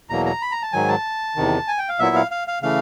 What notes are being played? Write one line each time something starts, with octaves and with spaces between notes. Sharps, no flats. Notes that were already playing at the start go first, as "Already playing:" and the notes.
E2 B2 F#3 A#3 A#5
A#5
B5
A#5
A5
G#2 D#3 F#3 G#5
A5
E2 C3 D#3
G#5
G5
F5
A#2 F#3 B3 E4 E5
F5
F5
F5
C#3 E3 A3 F5